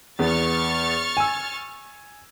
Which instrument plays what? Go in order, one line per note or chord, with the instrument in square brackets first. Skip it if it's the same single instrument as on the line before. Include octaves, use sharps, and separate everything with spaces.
[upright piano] E2 B3 [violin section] C#6 F6 A6
[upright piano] G#5 E6